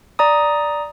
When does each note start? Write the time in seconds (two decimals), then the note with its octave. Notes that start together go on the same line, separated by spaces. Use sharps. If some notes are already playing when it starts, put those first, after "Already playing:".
0.19 D5 A#5 D#6